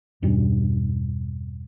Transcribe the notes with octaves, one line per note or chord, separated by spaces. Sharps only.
E2 G2 B2 G3